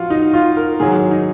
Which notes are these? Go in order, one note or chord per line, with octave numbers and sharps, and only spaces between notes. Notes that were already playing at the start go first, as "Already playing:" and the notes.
Already playing: F3 F4 F#4
D#4
F4
A#4
G#2 D#3 F#3 G#4
D#4